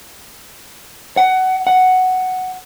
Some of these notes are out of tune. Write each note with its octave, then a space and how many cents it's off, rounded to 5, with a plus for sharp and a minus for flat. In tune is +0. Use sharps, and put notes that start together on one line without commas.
F#5 +20
F#5 +5